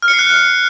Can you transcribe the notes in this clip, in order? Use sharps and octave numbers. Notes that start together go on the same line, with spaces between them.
F6
C#7
C7
F#6